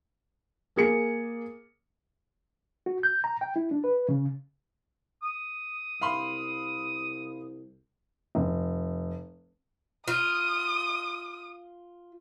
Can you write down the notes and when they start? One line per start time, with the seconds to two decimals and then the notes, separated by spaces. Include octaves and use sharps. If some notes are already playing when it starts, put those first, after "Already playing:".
0.76 A#3 G#4 C#7
2.86 F#4
3.03 G6
3.24 A#5
3.41 G5
3.56 E4
3.71 D4
3.84 B4
4.09 C#3
5.23 D#6
6.01 C2 F5 B5 C6
8.35 F1
10.08 F4 D#6